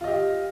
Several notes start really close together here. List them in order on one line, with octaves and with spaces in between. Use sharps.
F4 D#5 G4